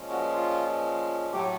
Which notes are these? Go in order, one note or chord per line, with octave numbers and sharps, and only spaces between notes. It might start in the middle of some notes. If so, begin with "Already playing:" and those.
Already playing: A#2 F3 G#3 C#4
F#4
F4
A2 F#3 A3 G4